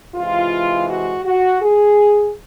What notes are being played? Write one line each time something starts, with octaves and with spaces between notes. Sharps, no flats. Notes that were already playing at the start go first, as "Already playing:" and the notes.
C3 E3 G#3 F4
F#4
F#4
G#4